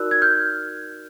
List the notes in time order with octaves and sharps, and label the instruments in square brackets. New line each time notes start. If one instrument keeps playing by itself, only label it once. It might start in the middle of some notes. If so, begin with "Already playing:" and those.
Already playing: [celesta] D#4 F#4 A#4 D5 E6 F#6
G#6
F6 G6